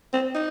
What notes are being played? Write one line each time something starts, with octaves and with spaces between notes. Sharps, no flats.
C4
D#4